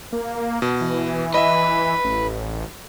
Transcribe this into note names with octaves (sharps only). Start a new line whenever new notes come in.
A#3
B2
E3
B4 D#5 E5
A1